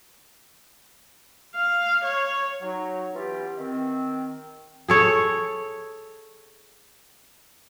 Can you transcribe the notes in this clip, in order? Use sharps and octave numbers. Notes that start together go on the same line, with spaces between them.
F5
C#5
F#3 D#4
E3 B3 C#4 F4 G4
D#3 C4
G#4 A4 C#5